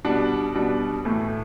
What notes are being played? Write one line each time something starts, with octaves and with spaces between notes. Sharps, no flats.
B2 G3 D4 F#4
B2 G3 D4 F#4
A2 E3 A3